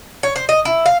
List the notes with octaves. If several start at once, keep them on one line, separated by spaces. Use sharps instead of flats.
C#5
C5
D#5
E4
F5